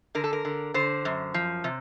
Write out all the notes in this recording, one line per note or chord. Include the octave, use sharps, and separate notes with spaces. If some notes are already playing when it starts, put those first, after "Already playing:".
D3 A#4
A4
A#4
D3
D3 C5
F#2
F3
C3